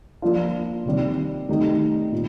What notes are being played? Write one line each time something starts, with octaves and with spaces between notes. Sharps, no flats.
F3 A#3 D4 F4
C3 D#3 G3
D#3 A3 D#4 G4
A#2